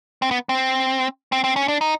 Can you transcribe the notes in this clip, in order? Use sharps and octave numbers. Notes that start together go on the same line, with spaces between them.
C4
B3
C4
C4
C4
C#4
D4
D#4